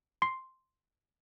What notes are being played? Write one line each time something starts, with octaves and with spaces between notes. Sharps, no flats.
C6 C7